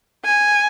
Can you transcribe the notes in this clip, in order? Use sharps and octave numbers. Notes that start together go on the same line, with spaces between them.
G#5